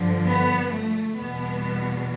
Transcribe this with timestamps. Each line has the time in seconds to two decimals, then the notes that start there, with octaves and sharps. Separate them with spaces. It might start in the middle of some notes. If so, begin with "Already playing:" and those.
Already playing: G2 D3 F3
0.26 B3
0.72 A3
1.17 E2 B2 G3 B3